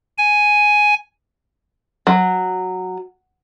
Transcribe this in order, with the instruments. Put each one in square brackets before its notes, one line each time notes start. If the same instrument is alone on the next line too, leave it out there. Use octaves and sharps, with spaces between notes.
[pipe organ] G#5
[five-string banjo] F#3